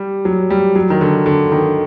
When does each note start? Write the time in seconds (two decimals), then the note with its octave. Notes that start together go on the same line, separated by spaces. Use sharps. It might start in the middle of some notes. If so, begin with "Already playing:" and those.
Already playing: G3
0.25 F#3
0.50 G3
0.75 F#3
0.90 D#3
1.01 D3
1.26 D3
1.52 D#3